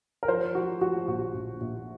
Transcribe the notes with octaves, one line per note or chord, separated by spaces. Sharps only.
A#4
F3 C5
F3 F#4
F3 F#4
A#1 F#4
A#1
A#1